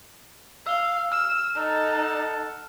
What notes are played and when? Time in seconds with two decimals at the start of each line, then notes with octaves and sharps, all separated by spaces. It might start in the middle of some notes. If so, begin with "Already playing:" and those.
0.67 F5 E6 G7
1.12 E6 F6
1.56 D#4 A4 F#5 A5